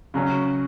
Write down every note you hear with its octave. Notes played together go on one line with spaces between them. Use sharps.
C#3 F#3 C#4